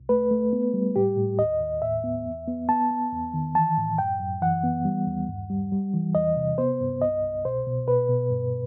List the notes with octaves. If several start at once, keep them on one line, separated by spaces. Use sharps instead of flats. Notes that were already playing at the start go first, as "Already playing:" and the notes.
Already playing: C2
A3 B4
A3
B3
G3
A2 G4
A2
D#2 D#5
D#2
A2 E5
B3
E2
B3
B3 A5
B3
E2
D#3
E3 A5
A2
F#2 G5
F#2
E3 F#5
B3
G3
D#2
G2
G3
G3
E3
E2 D#5
C3
B3 C5
G2
C2 D#5
C2
B2 C5
B2
B2 B4
B2
G2